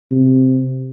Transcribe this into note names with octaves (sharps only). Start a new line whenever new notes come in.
C3